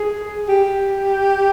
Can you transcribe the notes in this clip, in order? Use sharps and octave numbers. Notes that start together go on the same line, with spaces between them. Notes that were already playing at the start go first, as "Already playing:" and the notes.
Already playing: G#4
G4